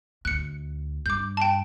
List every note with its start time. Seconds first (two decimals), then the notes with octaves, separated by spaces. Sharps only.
0.25 D2 F#6 C#7
1.06 G2 D6 G6
1.37 G5 A5